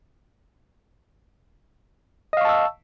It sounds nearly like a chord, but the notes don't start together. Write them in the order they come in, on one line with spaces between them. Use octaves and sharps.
D#5 F5 C#6 A5 E6